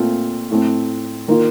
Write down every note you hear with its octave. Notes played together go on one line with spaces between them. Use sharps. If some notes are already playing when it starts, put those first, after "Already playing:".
Already playing: A#2 A3 C4 F4
A2 A3 C4
D#3 A#3 F4